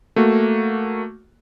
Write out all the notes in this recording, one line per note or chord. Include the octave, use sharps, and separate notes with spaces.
A3 A#3 F#4